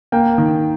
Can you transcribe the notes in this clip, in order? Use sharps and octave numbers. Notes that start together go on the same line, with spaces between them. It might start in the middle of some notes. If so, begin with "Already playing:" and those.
A#3 G5
D#3